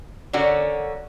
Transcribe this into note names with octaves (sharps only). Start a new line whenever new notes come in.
D3 A#3 C#4 F#4 D5